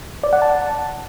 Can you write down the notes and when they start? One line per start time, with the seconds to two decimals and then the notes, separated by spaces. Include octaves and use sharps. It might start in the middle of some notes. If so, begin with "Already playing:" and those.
0.23 D5
0.33 F#5
0.42 A5